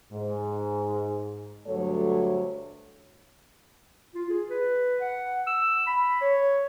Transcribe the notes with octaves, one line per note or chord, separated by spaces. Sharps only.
G#2
D2 G2 F#3 A3 A4 C#5
F4
G#4
B4
F#5
E6
B5
C#5